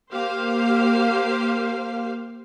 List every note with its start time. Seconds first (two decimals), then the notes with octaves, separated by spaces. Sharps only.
0.12 A#3 G4 C5 F5